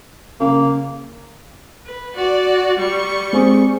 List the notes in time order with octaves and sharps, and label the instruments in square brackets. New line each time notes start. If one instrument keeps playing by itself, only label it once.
[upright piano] C#3 [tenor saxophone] A#3
[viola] B4
F#4 D5
G3 C#6
[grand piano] G#3 C4 G#4